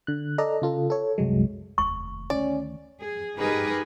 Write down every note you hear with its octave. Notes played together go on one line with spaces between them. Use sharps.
D3 F#6
A4 D5 D#5 A#5
C#3 F4 A4
A4 C#5
C2 F#2 F#3 G#3
F1 D#2 C#6
D2 D#3 C#4 D5
G#4
D#4 G4 G#4 A#4 B4